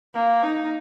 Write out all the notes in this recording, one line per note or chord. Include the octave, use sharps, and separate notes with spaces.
A#3
D#4